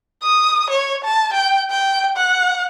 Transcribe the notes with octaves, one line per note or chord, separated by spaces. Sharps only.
D#6
C#5
A5
G5
G5
F#5